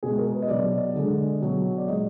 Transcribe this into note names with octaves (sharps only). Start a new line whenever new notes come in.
B2 G#3 G#4
A#4
B4
D#5
B2 F#3 D5
D3 G#3
B2 F#3
D5
A#2 G#3 D#5